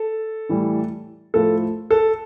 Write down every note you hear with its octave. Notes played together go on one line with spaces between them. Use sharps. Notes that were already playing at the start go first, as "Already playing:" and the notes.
Already playing: A4
A2 E3 G3
A2 F3 A4
A4